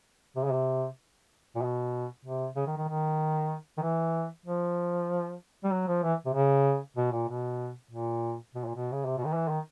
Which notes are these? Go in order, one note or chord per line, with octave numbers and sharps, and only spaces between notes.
C3
C#3
C3
A#2
B2
C3
C#3
D#3
D#3
D#3
D#3
E3
F3
G3
F#3
F3
E3
C3
C#3
B2
A#2
B2
A#2
B2
A#2
B2
C#3
C3
B2
D#3
E3
D#3